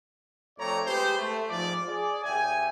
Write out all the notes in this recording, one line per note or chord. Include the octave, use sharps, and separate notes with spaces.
F2 A3 C4 C#5 D5 A#5
G#3 G4 B4 C5
A3
G#2 F3 D5
G#4 D5
D#2 E5 G5 G#5